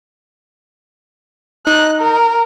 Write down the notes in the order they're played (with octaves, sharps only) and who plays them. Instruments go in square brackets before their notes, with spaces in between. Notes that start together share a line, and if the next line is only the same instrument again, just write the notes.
[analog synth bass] D#4 [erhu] F#6
[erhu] A#4